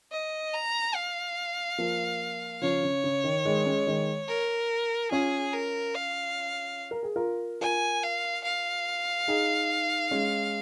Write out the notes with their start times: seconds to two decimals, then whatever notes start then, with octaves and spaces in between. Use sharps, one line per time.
0.12 D#5
0.54 A#5
0.95 F5
1.78 F3 A#3
2.61 C#3 F3 C#5
2.83 C#3
3.04 C#3
3.24 D#3
3.45 D#3 G#3
3.65 G#3 C#4
3.87 D#3 G#3
4.28 A#4
5.11 C#4 F4 G#4
5.53 A#4
5.95 F5
6.91 A#4
7.03 G#4
7.16 F4 A#4
7.61 F4 A#4 G#5
8.03 F5
8.44 F5
9.28 D#4 G#4
10.11 G#3 C#4